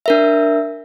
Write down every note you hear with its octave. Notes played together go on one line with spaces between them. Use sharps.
D4 A#4 E5